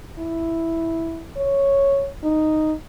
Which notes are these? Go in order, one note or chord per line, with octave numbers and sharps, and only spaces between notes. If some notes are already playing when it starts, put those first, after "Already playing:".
E4
C#5
D#4